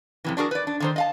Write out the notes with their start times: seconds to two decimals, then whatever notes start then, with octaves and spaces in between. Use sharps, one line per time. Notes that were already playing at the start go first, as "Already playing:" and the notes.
0.24 F2 C3 E3
0.37 D4 F#4 G#4 A#4
0.51 B4 D5
0.67 D4
0.80 D3 D#3 C5
0.96 D#5 F5 A5